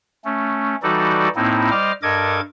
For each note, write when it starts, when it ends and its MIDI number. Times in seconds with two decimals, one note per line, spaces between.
0.25 0.76 57
0.25 0.76 61
0.83 1.28 52
0.83 1.28 55
0.83 1.28 63
0.83 1.28 66
0.83 1.28 69
0.83 1.28 74
1.36 1.70 45
1.36 1.70 58
1.36 1.70 60
1.36 1.70 63
1.36 1.70 64
1.71 1.92 55
1.71 1.92 72
1.71 1.92 75
1.71 1.92 86
1.71 1.92 89
2.03 2.40 43
2.03 2.40 69
2.03 2.40 70
2.03 2.40 75
2.03 2.40 86
2.03 2.40 92